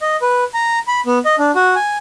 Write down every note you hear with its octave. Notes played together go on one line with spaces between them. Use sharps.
D#5
B4
A#5
B5
B3
D#5
D4
F#4
G#5